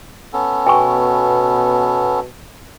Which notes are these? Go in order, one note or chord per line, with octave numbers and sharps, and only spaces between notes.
B3 C#4 A4
B2 G5 G#5 C#6